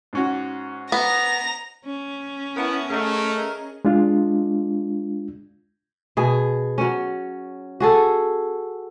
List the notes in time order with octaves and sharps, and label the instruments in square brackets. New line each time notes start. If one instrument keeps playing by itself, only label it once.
[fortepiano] G#2 C#4 F#4
[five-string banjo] B3 [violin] A#5 F7
[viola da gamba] C#4
[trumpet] B3 [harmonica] E4 [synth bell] A#4 F#5 A5
[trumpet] A3 [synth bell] G#4 D#5 [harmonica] A#4 F6
[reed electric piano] G#3 D4 F4
[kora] B2 G#4
F#3 C#4
F#4 G#4 A4